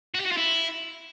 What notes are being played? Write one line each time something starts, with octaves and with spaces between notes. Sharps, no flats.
F#4
G4
F#4
F4
E4